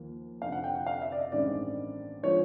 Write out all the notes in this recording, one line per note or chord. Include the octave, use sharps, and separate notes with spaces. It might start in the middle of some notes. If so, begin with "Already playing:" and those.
Already playing: D#2 F3 A#3
F1 F2 D3 F5
F#5
G5
F#5
F5
E5
D5
D#5
A1 G2 D#3 G#3 C4 D5
D3 F3 G#3 C#5